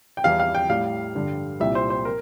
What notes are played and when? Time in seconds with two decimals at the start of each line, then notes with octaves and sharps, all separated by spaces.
0.17 G5
0.24 E2 E3 G3 F5
0.39 F5
0.55 G5
0.69 A2 G3 F5
1.15 G2 D3 G3
1.60 C2 A#2 G3 E5
1.75 C5
1.90 C5
2.05 A#4